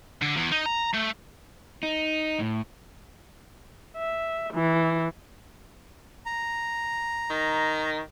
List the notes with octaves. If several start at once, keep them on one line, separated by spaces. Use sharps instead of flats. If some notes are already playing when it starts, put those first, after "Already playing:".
D3
E2
D#4
A#5
A3
D#4
A2
E5
E3
A#5
D#3